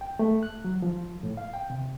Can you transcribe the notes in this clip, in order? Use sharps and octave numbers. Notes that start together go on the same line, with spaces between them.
G5
A3
F#6
F#3
F3
A2
F5
G5
C3